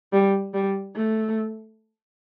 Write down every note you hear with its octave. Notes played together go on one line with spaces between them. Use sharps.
G3
G3
A3